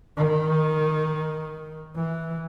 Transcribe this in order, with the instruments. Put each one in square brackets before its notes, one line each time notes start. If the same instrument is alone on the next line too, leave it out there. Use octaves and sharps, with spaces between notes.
[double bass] D#3
E3